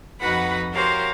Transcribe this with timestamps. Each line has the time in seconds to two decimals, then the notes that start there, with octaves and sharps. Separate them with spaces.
0.20 F2 D#4 F#4 B4 F#5 B5
0.74 F#4 G4 A#4 C5 C#5 F5